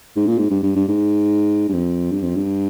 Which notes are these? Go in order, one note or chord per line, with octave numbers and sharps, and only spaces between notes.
G#2
A#2
G#2
G2
G2
G2
G#2
G2
F2
G2
F2
G2